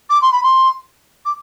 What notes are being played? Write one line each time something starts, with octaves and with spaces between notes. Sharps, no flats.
D6
C6
B5
C6
D6